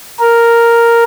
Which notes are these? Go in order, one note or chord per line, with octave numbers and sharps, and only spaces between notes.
A#4